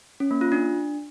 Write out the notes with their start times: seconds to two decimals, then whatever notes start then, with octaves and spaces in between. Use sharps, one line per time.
0.20 C#4
0.31 A#3
0.41 F4
0.52 D4